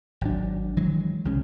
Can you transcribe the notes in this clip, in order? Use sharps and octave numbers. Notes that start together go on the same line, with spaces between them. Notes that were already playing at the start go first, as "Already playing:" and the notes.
G#1 F#3 D4
D#3 E3 F#3 G#3
C2 C#3 G#3 C#4